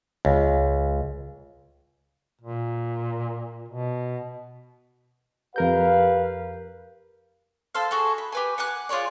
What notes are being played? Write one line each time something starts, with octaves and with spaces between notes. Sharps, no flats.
C#2
A#2
B2
F2 G4 A#4 B4 F5 G6
A4 C5 F5
F#4 G#4 A4
B5
G4 B4 G#5
F#5 G#5 D6 F#6
F4 G#4 C#5 D5